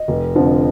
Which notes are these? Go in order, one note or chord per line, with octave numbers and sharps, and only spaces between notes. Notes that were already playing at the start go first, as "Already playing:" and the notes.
Already playing: D#5
F1
F2 D3 F3